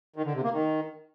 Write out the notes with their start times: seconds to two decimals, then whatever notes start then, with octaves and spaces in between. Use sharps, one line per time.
0.16 D#3
0.25 D3
0.35 C3
0.44 A#3
0.53 D#3